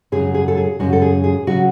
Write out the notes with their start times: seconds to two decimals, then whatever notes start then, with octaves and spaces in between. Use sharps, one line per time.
0.12 F#2 C#3 F#3 G#4
0.34 G#4
0.48 A4
0.57 G#4
0.79 F#2 C#3 F#3 F#4
0.93 A4
1.02 G#4
1.24 G#4
1.47 C#3 F#3 F#4